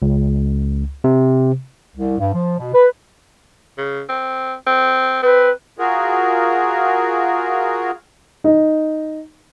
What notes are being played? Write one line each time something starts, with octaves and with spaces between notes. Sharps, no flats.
C#2
C3
C2
G2
F3
B2
B4
C#3
C4
C4
C4 B4
F4 F#4 G#4 A#4
D#4